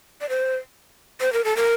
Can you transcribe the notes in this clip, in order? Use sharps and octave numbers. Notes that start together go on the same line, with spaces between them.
D5
C5
C5
A#4
A4
A#4